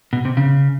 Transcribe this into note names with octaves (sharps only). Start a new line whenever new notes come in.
B2
C3
C#3